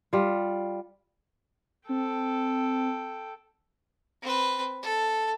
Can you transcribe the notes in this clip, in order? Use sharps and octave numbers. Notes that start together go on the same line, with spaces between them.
G3 F4
C4 A4 G5
C4 B4
A4